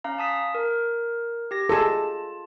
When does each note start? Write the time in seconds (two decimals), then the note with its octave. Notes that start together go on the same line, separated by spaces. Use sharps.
0.04 C#4 F5 A#5
0.18 A5 D#6 B6
0.55 A#4
1.51 G4 A#6
1.69 F4 G#4 A4 A5